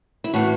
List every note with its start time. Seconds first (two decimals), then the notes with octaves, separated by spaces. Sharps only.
0.24 E4
0.33 A2 E3 A3 F#4